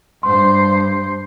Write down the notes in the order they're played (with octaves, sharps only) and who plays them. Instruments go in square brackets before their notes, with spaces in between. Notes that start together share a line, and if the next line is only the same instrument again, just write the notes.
[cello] G2 C5 [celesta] C6